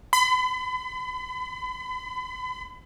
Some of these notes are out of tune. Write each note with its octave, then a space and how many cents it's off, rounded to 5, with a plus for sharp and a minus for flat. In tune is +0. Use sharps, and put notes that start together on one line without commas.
B5 +40